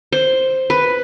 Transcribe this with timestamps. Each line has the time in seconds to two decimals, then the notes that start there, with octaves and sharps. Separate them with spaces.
0.12 C5
0.70 B4